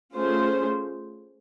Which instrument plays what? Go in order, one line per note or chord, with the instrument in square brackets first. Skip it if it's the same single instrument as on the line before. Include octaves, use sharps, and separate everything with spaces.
[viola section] A3 C#4 F4 G#4 C5